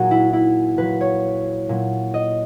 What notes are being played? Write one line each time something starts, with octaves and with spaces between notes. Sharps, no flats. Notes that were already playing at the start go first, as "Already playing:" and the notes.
Already playing: A#2 F#3 F#4 G#4 A#4
E4
E4
A#2 F#3 B4
C#5
A#2 F#3
D#5